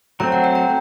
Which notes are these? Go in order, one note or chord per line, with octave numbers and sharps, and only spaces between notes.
F#3 A3 C4 A#5
F#5
G5
A#5